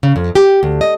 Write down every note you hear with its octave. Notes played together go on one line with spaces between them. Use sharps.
C#3
F2
G4
D2
D#5